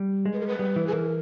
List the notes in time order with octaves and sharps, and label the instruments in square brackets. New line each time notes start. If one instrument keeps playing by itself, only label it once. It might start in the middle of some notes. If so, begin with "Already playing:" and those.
Already playing: [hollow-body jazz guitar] G3
G#3
[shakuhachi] B4
A#4
B4
[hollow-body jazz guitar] G3
E3
[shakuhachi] G#4
[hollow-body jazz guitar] E3 [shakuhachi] A#4